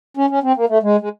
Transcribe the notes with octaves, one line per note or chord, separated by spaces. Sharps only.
C#4
C#4
C4
A#3
A3
G#3
G#3